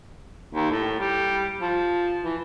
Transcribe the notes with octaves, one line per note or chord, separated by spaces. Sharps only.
D#2
A2
G3
F3
E3